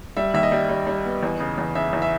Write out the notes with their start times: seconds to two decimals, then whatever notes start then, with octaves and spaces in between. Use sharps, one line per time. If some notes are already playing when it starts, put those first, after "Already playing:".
0.17 G3 E5
0.34 D#2 E5
0.43 D#5
0.52 G3
0.69 G3
0.87 G3
1.05 B3
1.23 E2
1.40 C#3
1.58 E2
1.75 C#3 E5
1.93 E2
2.02 E5